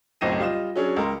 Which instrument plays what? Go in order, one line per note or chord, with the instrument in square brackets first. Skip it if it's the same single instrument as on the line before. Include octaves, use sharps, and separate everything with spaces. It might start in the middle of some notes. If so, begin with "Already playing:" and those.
[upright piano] F#1 B1 A2 C4 A#6 D#7
G3 F4 D#5 E7
F#3 C#4 D4 G#4
C#2 A#4 C6